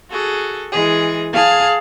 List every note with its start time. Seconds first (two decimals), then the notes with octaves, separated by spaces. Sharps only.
0.12 F#4 G#4 A4
0.73 E3 G#3 G#4
1.33 G#4 F5 A5 G#6